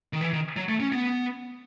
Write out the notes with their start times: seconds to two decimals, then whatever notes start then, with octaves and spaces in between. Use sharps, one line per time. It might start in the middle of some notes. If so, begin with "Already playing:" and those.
0.13 D#3
0.21 E3
0.33 D#3
0.56 F#3
0.69 A3
0.80 C#4
0.92 B3